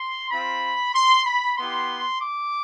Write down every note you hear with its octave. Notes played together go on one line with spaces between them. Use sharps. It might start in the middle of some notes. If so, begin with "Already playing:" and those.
Already playing: C6
C4 F4 B5
C6
B5
B3 E4 G4 C6
D6